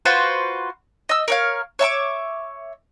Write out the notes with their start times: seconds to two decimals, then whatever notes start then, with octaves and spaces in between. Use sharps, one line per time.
0.05 F4 F#4 B4 C5
1.09 D#5 E6
1.28 A#4 C#5 F5
1.79 C#5 E5 C#6 D6